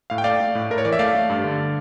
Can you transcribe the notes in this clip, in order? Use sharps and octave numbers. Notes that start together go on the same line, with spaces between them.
A2 F5
G5
A3 D5 F5
A3
A2
A2 A#4
C#5
E3 D5
E5
A3 D5 F5
A3
G2
D3